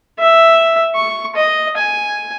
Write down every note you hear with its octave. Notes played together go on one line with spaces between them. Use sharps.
E5
C#6
D#5
G#5